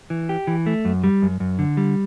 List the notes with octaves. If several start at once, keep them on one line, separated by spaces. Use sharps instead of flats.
E3
G4
E3
A3
F#2
G3
F#2
F#2
D3
G3